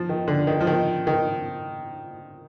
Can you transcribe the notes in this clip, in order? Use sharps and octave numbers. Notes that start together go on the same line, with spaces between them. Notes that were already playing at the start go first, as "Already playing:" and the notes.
Already playing: F3
D#3
D3
D#3
F3
D#3
D#3